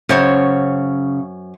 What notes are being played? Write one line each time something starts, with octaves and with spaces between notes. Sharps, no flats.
F#2 C#3 C5 C#5